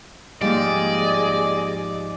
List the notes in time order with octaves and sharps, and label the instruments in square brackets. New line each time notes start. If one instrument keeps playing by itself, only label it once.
[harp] G#2 F3 A#3 [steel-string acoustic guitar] G3 [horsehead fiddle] G#4 D#5 [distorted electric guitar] D5